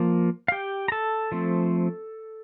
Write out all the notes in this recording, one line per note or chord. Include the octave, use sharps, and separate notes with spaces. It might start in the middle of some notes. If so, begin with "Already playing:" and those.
Already playing: F3 A#3
F5
G4 G5
A#5
A4 A5
F3 A3 C4